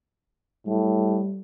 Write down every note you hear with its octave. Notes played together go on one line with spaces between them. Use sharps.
A2 G3